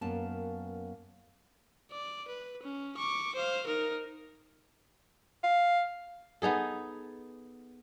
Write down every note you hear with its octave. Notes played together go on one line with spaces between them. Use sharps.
F#2 A#3 B3 C#4 A5
D5
B4
C#4
C#6 D6
C5 F5
D#4 A#4
F5
B3 D#4 G#4 A4